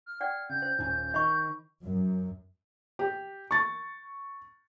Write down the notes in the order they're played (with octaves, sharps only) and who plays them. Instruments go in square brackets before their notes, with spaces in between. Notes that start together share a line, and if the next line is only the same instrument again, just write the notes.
[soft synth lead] F6
[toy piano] D5 F#5 G5
[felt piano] C#3 [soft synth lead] G6
[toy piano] C5
[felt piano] D#1 C#4 G#5
[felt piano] D#3 [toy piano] D#5 B5 C#6
[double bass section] F#2
[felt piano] G4
C#6 A6